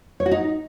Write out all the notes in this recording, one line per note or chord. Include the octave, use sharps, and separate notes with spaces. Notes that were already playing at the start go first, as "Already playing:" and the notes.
C#5
F#4
D#4